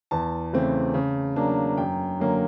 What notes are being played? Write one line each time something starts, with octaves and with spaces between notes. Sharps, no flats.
E2 A5
C#3 E3 A3 C4
C#3
F#3 A#3 D4
F#2 G5
D3 F#3 A#3 C#4